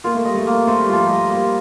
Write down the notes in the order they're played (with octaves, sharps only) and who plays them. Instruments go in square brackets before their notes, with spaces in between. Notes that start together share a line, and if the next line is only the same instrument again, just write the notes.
[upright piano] A#3 [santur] F4
[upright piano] A3
[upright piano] G3 [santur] D#5
[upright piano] A3
[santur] A#3
[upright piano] A3 [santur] C5
[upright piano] G3
[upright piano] F3 [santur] F4
[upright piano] G3 [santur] D#5
[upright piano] G3 [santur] A#3